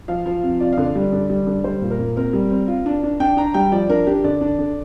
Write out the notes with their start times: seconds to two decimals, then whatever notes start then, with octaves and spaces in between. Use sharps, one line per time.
0.08 F3 F5
0.26 F3
0.43 C3
0.60 F4 D5
0.73 D3 F5
0.86 D5
0.96 G3
1.12 D3
1.30 G3
1.47 D3
1.64 G3 C5
1.82 A#2
1.91 A#4
1.99 A#2
2.16 C4 A#4
2.33 G3
2.51 C4
2.68 F4
2.86 D4
3.03 D4
3.20 D4 G5
3.37 D4 A#5
3.54 G3 G5
3.72 F3 D5
3.89 D4 A#4
4.07 D4 G4
4.24 D3 D5
4.41 D4
4.59 D3